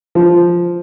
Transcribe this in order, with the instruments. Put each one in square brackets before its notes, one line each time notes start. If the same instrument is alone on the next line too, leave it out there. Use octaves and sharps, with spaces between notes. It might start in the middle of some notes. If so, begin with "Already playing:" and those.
[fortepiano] F3